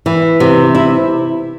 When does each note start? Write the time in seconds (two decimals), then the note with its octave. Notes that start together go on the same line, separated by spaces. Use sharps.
0.06 E3
0.40 C3
0.75 E4